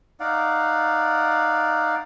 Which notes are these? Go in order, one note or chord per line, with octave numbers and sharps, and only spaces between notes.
D#4 D5 F5 F#5